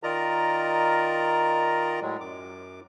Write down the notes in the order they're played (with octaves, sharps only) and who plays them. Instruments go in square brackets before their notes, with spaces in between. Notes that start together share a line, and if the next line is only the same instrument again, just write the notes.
[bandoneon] D#3 F4 A#4 D5 D#5 A#5
A2 F#3 G#3
F#2 D6